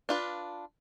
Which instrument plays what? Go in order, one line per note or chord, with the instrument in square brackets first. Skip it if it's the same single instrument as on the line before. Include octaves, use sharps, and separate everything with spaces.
[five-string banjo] D4 F4 B4